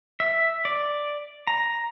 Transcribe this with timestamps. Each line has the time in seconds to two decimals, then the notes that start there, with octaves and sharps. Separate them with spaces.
0.20 E5
0.65 D5
1.47 A#5